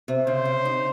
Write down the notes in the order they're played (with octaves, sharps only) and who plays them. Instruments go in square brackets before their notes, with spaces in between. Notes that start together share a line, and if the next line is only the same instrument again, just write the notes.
[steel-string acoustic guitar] C3
[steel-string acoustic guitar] C#3 [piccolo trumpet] C5
[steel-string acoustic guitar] C#3
D#4